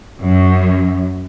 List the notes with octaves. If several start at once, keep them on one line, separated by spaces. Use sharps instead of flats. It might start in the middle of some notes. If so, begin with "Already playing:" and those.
F#2